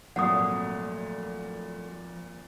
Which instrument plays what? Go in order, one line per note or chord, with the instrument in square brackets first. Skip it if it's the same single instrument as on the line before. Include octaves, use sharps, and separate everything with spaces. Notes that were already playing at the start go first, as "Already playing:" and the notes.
[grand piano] G#1 A#2 [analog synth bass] F3 [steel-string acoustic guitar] F#3 A3 [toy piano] F#5 D#6